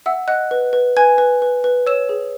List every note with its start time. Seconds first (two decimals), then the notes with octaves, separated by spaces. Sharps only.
0.06 E5 F#5 E6
0.28 D#5 F#5 F#6
0.51 B4
0.73 B4
0.97 B4 G#5 G#6
1.18 B4
1.42 B4
1.64 B4
1.86 C#5 E6 E7
2.09 G#4